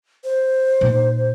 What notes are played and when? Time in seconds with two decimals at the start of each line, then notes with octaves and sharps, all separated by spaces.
0.24 C5
0.81 A#2 D#4